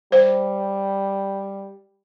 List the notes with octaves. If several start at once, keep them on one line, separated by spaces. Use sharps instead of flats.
G3 C5